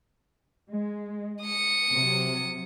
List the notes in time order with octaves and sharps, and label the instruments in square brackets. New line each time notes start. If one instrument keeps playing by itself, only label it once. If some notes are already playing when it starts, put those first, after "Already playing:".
[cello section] G#3
[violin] D#6 C#7
[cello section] C3 F#3